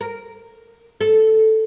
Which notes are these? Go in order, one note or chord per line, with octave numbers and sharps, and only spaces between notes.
A#4
A4